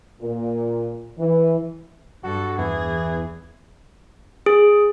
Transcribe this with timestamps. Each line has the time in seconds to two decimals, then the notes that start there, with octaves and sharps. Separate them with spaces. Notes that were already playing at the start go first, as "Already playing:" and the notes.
0.21 A#2
1.18 E3
2.24 G2 F#4 A4
2.58 E2 E3 G#4
4.46 G#4